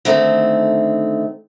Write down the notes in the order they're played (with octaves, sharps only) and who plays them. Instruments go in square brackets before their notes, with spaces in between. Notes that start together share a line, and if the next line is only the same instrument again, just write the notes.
[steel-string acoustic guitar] D3 D#3 A3 C4